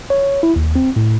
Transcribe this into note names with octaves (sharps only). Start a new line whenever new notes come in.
C#5
E4
D#2
C4
A2